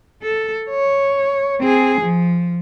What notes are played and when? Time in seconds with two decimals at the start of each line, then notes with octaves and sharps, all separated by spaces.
0.23 A4
0.69 C#5
1.61 C4 G#4
2.01 F3